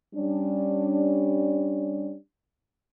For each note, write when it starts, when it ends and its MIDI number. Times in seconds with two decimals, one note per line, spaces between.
0.14 2.15 55
0.14 2.15 61
0.14 2.15 62